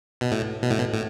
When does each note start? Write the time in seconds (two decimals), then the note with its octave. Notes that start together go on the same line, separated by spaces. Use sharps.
0.21 B2
0.32 A2
0.63 B2
0.71 A2
0.78 B2
0.92 A2